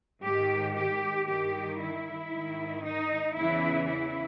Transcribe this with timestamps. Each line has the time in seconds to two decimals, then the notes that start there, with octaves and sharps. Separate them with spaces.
0.24 G#2 G4
0.29 D#3
0.75 G4
1.27 G2 D#3 G4
1.79 E4
2.32 G#2 D#3
2.84 D#4
3.35 E2 C#3 E3 E4
3.87 E4